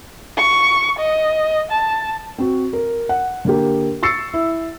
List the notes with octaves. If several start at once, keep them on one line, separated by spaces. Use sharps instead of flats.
C#6
D#5
A5
C4 F#4
A#4
F#5
D3 A#3 G4
C#6 E6 A6 C7 C#7
E4